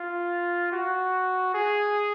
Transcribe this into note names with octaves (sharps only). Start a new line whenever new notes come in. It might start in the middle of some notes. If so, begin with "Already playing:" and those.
Already playing: F4
F#4
G#4